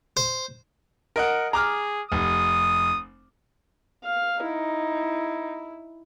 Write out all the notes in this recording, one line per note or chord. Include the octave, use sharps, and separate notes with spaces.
C5
A#4 D#5 F#5
G#4 A#5 D6 F6
F1 D#6
F5
D#4 E4